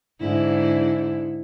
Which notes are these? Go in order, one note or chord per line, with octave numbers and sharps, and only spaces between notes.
G#2 D3 E4